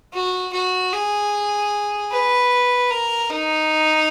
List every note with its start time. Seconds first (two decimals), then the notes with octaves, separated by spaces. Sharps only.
0.14 F#4
0.53 F#4
0.93 G#4
2.12 B4
2.91 A#4
3.30 D#4